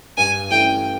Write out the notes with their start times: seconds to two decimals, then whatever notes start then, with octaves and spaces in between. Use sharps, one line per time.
0.17 G2 G#5
0.50 E3 A3 C#4 G5